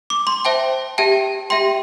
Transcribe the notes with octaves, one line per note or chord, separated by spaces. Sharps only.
D6
C6
C5 E5 G5 A5
G4 E5 G5 A5
G4 E5 G5 C6